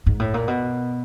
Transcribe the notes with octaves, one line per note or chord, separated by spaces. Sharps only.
G#2
A2
A#2
B2